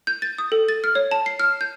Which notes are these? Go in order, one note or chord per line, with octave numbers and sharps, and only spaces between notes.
G6
A6
D#6
A4
A6
F6
C#5
A5
C7
F6
G6